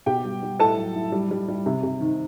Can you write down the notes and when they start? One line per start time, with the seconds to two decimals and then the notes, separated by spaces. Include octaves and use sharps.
0.06 B2 G4 G5
0.24 G3
0.43 G3
0.60 A2 A4 A5
0.77 F#3
0.95 A2
1.12 G3
1.31 G3
1.48 G3
1.66 C3
1.83 C3
2.00 D#3